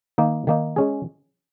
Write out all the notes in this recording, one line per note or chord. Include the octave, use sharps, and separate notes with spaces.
D#3 A#3 D#4
D#3 A#3 D#4
G#3 C#4 G#4